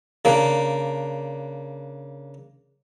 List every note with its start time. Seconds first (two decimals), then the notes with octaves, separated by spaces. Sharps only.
0.25 C#3 A#3 D4